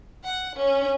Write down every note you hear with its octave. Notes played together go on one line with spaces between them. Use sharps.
F#5
C#4